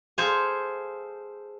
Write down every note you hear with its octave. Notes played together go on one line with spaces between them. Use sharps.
G#4 A4 C5 F5 G#5